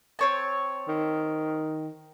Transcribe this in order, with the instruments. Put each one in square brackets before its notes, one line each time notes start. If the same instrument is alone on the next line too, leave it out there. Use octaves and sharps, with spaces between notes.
[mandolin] C4 C#5 A5
[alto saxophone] D#3